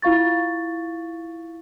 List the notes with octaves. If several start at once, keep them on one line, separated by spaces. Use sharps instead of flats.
E4 F4 F5 C#6 A6